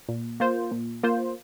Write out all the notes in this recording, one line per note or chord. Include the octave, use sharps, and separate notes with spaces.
A#2
A#3 F4 C5
A#2
A#3 F4 C5